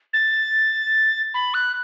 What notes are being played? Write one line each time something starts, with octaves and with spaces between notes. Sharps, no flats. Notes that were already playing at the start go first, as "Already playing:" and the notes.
A6
B5
F#6